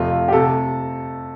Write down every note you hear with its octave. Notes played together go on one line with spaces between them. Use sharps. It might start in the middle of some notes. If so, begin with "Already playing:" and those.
Already playing: F2 C3 F3 A3 F4
G4
C3 A3 A4